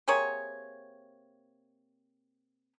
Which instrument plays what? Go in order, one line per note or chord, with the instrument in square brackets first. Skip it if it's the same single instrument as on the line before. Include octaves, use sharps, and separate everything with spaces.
[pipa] C3 A#3 G#4 C#5